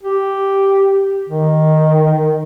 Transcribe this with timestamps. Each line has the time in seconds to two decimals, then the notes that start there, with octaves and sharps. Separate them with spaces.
0.03 G4
1.29 D#3